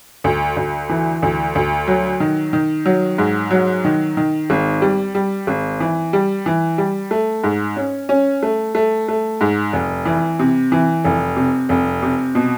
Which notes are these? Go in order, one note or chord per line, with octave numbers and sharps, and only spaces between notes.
D2
D2
E3
D2
D2
F#3
D#3
D#3
F#3
G#2
F#3
D#3
D#3
G#1
G3
G3
G#1
E3
G3
E3
G3
A3
G#2
C#4
C#4
A3
A3
A3
G#2
F1
E3
C3
E3
F1
C3
F1
C3
B2